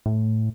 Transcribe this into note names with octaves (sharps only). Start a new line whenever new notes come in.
A2